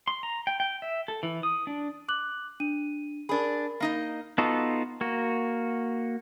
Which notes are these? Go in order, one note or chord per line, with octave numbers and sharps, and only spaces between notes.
C6
A#5
G5
G5
E5
A4
E3
D#6
D4
D6 F#6 F#7
D4 D#7
D4 G#4 A#4 B5
A#3 D#4 D#5
B3 D#4 F4 F#4 A4
A#3 F#4